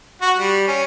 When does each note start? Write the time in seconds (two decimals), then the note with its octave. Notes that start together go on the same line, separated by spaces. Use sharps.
0.22 F#4
0.37 G3
0.68 C#4